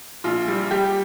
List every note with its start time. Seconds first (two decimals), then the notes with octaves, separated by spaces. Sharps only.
0.24 A#1 F4
0.48 G3
0.71 G3 G4